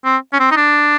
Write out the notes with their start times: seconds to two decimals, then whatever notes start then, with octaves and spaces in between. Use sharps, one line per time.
0.05 C4
0.33 C#4
0.40 C4
0.51 D#4
0.56 D4